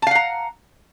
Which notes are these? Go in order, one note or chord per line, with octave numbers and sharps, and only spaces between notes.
F5 F#5 A5 A#5